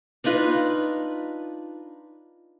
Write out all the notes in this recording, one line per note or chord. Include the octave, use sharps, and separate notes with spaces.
D4 D#4 F4 B4